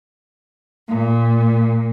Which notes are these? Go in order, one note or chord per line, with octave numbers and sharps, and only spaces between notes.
A#2